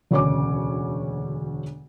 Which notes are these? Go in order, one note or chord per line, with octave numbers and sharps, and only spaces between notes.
E1 D2 C#3 C#5 G#5 D6